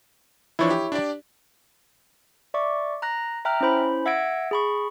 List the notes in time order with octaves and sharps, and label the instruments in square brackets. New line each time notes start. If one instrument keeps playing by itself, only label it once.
[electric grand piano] E3 F3 D4 [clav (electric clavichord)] E4 C#5
[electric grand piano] G4
D4 G4 D5
[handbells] D5 E5 C#6 D6
A#5 F#6 A#6
E5 G5 A#5 F6 F#6
C#4 E4 C5 B5
E5 F#5 E6 G#6 A#6 D7
G#4 B5 C#6